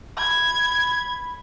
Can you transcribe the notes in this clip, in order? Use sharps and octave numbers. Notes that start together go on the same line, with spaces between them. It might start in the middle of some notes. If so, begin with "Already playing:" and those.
B5 G#6